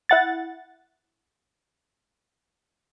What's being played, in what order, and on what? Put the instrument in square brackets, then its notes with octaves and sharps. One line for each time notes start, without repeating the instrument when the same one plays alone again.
[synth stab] E4 F#5 A6